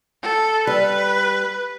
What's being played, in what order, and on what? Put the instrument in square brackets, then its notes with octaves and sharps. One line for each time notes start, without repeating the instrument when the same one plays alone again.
[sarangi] A4
[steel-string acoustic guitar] G3 [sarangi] B4